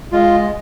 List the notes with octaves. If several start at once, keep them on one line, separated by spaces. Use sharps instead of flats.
G#3 F4